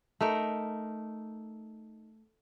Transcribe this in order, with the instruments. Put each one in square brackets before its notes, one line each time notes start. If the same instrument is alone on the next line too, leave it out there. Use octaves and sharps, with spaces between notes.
[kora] A3 D#4 A#4